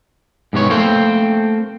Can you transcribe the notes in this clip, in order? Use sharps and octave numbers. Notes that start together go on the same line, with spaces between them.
G#2 C3 B3 C#5
A3 A#3 C4 C5